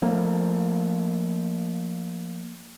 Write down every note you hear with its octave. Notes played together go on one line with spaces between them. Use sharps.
F3 A3 A#3